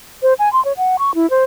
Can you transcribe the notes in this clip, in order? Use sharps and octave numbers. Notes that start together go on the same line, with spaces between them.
C5
G#5
C6
C#5
F#5
C#6
E4
C5